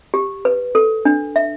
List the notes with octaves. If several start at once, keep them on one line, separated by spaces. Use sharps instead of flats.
G4
B4
A4
D4
E5